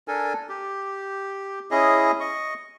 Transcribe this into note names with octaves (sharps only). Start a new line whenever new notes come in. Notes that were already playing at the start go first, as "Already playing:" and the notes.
D4 A4 A#4 G#5
G4
C#4 E4 G#4 D#5
D#5 C#6